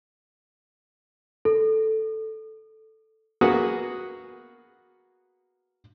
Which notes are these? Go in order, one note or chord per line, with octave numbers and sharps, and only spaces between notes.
A4
A#3 B3 F#4 G#4 F#5